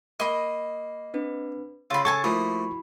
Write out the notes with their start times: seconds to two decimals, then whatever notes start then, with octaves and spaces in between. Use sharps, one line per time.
0.20 A#3 D#5 B5
1.14 C4 D4 B4
1.90 C#3 F4 B5 E6
2.05 A4 G#5 A5 C#6
2.24 F3 A3 A#3 E4 F#4 B5 D#6